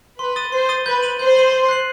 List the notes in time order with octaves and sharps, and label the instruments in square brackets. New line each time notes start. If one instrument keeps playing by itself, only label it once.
[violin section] B4 [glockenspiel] C6
[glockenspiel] D#6 A6 D#7 G7
[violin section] C5 [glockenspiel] C6
[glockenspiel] D#6 A6 D#7 G7
[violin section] B4 [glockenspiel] G6
[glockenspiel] D#7 F#7
[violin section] C5 [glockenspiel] G6
[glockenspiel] D#7 F#7
C6
F#6 C7 F#7